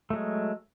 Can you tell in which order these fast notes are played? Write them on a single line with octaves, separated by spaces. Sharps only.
A3 F#3 G#3